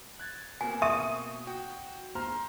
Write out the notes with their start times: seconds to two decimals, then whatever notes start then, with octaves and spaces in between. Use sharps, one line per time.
0.20 F#6 G#6 A6
0.61 B2 A#3 C4 G#5
0.82 E5 C#6 D#6 D#7
1.47 F#4 G5
2.15 C5 A#5 C6 F6